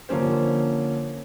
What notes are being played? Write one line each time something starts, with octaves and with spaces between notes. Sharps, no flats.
D3 F3 A#3 C#4 C5